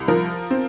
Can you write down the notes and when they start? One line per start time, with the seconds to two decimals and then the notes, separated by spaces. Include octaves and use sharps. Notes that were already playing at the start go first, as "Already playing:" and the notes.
Already playing: C2
0.08 F3 A#4
0.51 C4